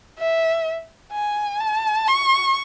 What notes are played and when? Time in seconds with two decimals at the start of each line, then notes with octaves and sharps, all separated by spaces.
0.19 E5
1.12 G#5
1.60 A5
2.08 C#6